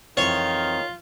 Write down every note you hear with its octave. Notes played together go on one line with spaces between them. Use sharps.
F2 D#3 E3 C4 F4 C#5